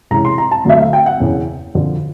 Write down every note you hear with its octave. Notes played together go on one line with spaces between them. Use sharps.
C3 E3 G#3 C#4 E4 A#5
C6
A#5
A5
D2 D3 F#3 A3 E5
F5
G5
F#5
E2 C#3 E3
F2 D3 F3